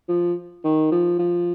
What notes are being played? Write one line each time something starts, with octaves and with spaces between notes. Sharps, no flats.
F3
D#3
F3
F3